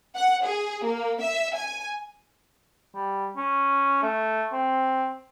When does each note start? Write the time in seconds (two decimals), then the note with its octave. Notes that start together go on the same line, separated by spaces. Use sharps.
0.15 F#5
0.45 G#4
0.84 A#3
1.22 E5
1.56 G#5
2.95 G3
3.37 C#4
4.02 A3
4.53 C4